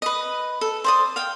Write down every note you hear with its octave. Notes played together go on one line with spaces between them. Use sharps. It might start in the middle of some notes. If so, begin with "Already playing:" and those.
B4 D#5
A4
C5 D5 D#6
F5 G5